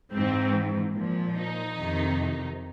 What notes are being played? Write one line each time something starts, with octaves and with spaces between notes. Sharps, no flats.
G#2 E3 C4
A#2 F3
D#4
F2 C3 D#3